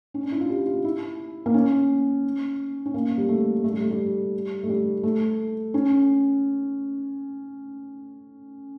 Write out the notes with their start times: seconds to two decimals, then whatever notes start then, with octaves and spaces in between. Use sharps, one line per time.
0.14 C#4
0.23 D4
0.32 E4
0.41 F4
0.50 G4
0.67 F4
0.84 E4
1.46 A#3
1.54 C#4
2.86 C#4
2.94 A#3
3.18 G3
3.29 A3
3.64 A3
3.73 G3
3.82 A3
3.90 G3
4.63 A3
4.69 G3
5.03 A3
5.74 C#4